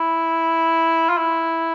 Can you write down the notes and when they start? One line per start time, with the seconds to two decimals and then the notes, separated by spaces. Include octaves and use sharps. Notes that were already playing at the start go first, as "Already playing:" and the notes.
Already playing: E4
1.09 F4
1.18 E4